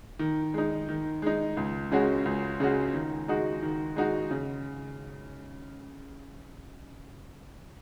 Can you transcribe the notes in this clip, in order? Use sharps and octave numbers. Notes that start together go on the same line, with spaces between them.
D#3
G#3 D#4
D#3
G#3 D#4
C#2
C#3 G#3 C#4 F#4
C#2
C#3 G#3 C#4 F#4
D#3
G#3 D#4 F#4
D#3
G#3 D#4 F#4
C#3